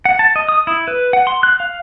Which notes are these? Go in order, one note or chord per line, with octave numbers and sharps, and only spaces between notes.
F#5
A5
D#5
D#6
E4
B4
F#5
C6
F#6
F5